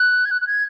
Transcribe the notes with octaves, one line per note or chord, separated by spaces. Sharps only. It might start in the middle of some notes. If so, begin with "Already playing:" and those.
Already playing: F#6
G#6
F#6
F#6
G#6